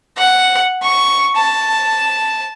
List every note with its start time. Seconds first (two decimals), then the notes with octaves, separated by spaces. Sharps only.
0.18 F#5
0.83 C#6
1.36 A5